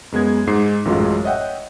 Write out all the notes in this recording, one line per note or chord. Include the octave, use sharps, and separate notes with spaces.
F#2 G#3 B3 G#6
G#2 G#3 C7
A1 F#2 A2 F#3 G#3 F4
C#5 D#5 E5 F#5 G5